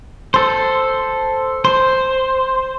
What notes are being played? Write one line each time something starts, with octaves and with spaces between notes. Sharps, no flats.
A4 C5
C5